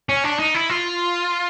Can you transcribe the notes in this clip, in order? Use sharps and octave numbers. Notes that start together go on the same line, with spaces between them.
C#4
D4
D#4
E4
F4